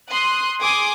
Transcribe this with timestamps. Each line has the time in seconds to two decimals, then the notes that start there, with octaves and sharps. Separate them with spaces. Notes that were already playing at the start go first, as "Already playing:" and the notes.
0.12 C6 D#6 F#6
0.62 G#4 G#5 C6 D6 D#6